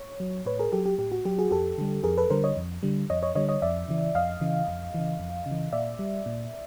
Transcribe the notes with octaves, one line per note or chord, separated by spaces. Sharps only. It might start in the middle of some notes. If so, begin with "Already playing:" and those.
Already playing: C#5
F#3
A2 B4 C#5
G#4 A#4
F#3 G4 A4
G4
A2 G4
F#4
F#3 G4
F#4 G#4
F2 G4 A4
D3 G3
F2 G#4 A#4
A4 B4
D3 G3 A#4 C5
C#5 D#5
F2
D3 G3
F2 C#5 D#5
C#5 D#5
D3 G3 C#5 D#5
C#5 D#5
F2 D5 E5
C#3 E3
F2 D#5 F5
C#3 E3
F2
C#3 E3
F2
C#3
E3
A#2 D5 E5
G3
A#2